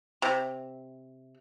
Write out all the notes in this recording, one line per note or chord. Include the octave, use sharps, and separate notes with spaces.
C3